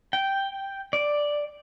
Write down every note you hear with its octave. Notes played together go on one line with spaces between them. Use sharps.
G5
D5